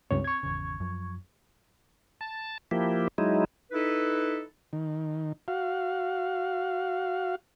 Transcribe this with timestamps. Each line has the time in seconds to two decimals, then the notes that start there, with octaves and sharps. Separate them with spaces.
0.11 C#2 G2 C4 C#5
0.24 C#6 G#6
0.43 G#1 E2 C#3
0.80 F#2 F3
2.21 A5
2.71 F3 A#3 E4 G4
3.18 F#3 G#3 D#4 E4
3.72 D#4 E4 A4 B4
4.73 D#3
5.48 F#4 F5